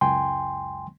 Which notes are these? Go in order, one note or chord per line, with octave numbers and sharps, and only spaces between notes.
C#2 F#2 G5 G#5 C6